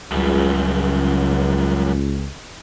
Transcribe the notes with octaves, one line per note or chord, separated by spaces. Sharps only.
C#2 F#2 G3